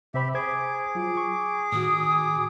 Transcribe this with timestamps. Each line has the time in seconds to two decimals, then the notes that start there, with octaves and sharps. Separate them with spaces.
0.14 C3 G4 C5 E5 B5
0.34 G#4 C5 D6 G#6
0.95 F#3 F4
1.17 C#6
1.72 A2 D#3 F#4 D#6